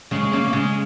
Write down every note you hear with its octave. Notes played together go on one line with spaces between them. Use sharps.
C#3 G#3
G#3
C#3 A#3
A#3
C#3 G#3